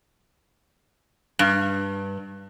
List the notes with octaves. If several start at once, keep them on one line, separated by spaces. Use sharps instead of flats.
G2